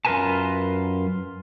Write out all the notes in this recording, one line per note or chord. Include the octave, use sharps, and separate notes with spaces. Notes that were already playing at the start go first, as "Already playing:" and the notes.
F#2 F4 A#4 B4 G#5 A5